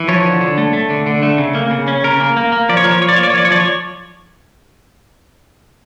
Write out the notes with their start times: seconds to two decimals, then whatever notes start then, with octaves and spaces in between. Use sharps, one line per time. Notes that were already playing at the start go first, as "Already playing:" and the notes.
Already playing: E3
0.08 F3 C#5
0.25 D3
0.41 D3
0.58 A3
0.73 A3
0.90 D3
1.06 D3
1.23 A3
1.38 C#3
1.55 A#3
1.71 C#3
1.88 C#4
2.04 C#3 A#4
2.20 A#3
2.37 A#3
2.52 A#3
2.69 F3 D5
2.77 C#5
2.84 F3 A#4
2.91 C#5
3.01 F3 C#5
3.09 D5
3.16 A#3 C#5
3.23 D5
3.30 C#5
3.33 F3 D5
3.45 C#5
3.50 F3 D5
3.60 C#5